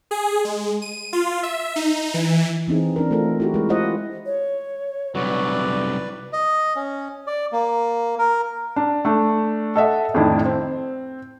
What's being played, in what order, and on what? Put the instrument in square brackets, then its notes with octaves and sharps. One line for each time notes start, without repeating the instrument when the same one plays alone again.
[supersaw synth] G#4
G#3
D#7
F4
E5
D#4
E3
[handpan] E3 C4 D#4 G#4
C4 D4 A#4
A3 F4 A4 A#4
E4 F#4 G4
G#3 A#4
E4 F4 C5 D#5 F#5
[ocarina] C#5
[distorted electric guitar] C2 F#3 [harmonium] B4 D5 [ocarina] C#6
[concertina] D#5
C#4
D5
A#3
A#4
[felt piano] D4
A3 D4
A4 D#5 E5 F#5
F2 A2 D#3 D4 E4
C4